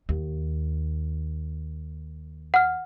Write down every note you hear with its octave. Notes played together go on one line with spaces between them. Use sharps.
D#2
F#5 F6